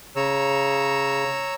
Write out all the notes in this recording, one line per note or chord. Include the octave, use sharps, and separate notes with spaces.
C#3 C#5 A#5 E6